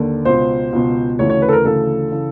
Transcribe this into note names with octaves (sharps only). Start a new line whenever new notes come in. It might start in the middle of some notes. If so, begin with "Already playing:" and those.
Already playing: D#2 D3
C#2 B2 C5
C#2 B2
D2 C#3 E3 C#5
C#5
B4
A4
A#4
D2 C#3 E3 A4
C#3 E3